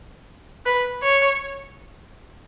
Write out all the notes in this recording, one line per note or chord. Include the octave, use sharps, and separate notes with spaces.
B4
C#5